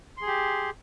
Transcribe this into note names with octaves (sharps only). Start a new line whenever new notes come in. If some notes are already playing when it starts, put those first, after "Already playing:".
G4 G#4 C6